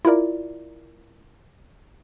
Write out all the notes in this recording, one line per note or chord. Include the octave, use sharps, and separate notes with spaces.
E4 F4 A#4 D5